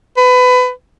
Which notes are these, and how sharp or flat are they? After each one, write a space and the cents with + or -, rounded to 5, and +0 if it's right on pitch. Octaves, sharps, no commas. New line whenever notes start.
B4 +25